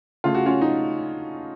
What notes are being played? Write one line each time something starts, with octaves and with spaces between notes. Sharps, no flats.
C#3 A3 F4
F#4
C#4 F4
D#4